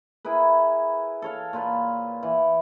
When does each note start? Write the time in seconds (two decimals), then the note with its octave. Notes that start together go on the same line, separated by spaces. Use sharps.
0.25 E4 G#4 A#4 B4
1.22 A4 C#5 F5
1.53 A#2 F4 B4
2.23 E3